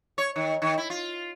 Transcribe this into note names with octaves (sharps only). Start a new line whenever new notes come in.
C#5
D#3
D#3
E4
F4